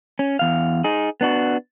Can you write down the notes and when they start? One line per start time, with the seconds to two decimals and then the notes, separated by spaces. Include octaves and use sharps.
0.19 C#4
0.39 E2 F5
0.84 D#4 G#4
1.21 B3 D4 F#4